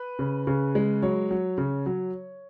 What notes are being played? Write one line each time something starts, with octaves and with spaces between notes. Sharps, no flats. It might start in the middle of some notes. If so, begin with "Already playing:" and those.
Already playing: B4
C#3
C#3
G#3
F#3 C#5
F#3
C#3
F#3